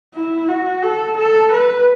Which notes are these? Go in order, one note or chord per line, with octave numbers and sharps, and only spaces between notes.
E4
F#4
A4
A4
B4